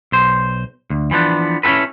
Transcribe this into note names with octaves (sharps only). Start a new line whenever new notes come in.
B1 C5
D2
E3 F3 B3 D4
C#4 E4 F#4 A4 B4